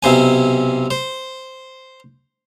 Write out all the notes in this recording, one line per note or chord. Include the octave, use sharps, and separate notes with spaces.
B1 C3 C5 G#5
C5